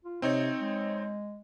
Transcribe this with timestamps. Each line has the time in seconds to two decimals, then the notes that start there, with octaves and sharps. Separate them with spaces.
0.04 F4
0.22 C3 C4 D#4 C#5
0.60 G#3